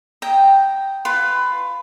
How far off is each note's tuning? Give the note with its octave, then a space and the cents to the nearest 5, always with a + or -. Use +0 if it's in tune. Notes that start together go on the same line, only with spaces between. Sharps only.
D#5 +5 G5 +0 A#5 +0
F4 +0 B4 +20